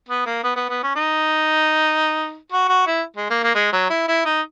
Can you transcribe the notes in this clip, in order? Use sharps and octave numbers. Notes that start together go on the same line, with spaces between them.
B3
A#3
B3
B3
B3
C#4
D#4
F#4
F#4
E4
G#3
A#3
A#3
G#3
F#3
E4
E4
D#4